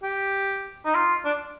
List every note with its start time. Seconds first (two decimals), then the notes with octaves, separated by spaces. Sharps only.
0.03 G4
0.85 D#4
0.95 F4
1.25 D4